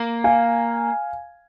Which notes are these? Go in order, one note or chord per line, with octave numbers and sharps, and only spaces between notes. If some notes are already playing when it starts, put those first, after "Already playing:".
Already playing: A#3
F5 G#5